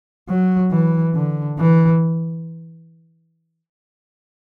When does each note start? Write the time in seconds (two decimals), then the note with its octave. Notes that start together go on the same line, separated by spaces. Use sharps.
0.29 F#3
0.71 E3
1.15 D3
1.58 E3